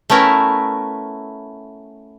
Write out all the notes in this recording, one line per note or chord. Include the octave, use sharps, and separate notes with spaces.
A3 B3 C#4 E4 A#4